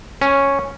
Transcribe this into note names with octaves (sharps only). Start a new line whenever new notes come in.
C#4